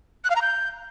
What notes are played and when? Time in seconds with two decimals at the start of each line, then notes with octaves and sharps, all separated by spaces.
0.24 F#6
0.30 F5
0.36 A#5
0.42 G6